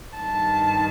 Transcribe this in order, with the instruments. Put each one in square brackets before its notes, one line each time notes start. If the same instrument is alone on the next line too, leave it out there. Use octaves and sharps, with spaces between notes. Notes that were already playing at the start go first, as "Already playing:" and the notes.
[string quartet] G2 D#3 G3 A5